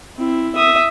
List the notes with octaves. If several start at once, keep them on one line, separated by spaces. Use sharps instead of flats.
C4 E4
E5 D#6